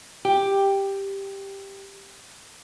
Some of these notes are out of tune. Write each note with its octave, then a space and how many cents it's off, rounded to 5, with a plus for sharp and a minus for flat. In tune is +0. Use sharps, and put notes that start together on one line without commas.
G4 +5